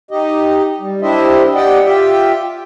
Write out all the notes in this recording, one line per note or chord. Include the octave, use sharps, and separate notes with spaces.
D#4 G4 D#5
G3
D4 E4 G4 C5 D#5 E5
G4 D5 D#5 F#5 G5
F4 G4 E5 G5